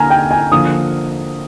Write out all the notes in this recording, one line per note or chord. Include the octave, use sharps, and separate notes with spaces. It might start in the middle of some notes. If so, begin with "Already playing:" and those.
Already playing: D3 A#3 G#5 A#5 F6
G5
G#5
D3 F3 A#3 D#6